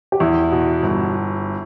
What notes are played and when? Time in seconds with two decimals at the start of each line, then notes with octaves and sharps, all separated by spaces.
0.12 G4
0.20 E2 E4
0.51 B2
0.82 G1